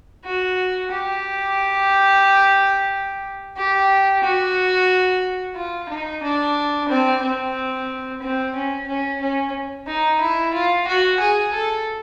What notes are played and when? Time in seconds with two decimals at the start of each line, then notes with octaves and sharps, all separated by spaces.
0.25 F#4
0.91 G4
3.57 G4
4.23 F#4
5.56 F4
5.89 D#4
6.23 D4
6.89 C4
7.22 C4
8.22 C4
8.55 C#4
8.88 C#4
9.21 C#4
9.87 D#4
10.21 E4
10.54 F4
10.87 F#4
11.20 G#4
11.53 A4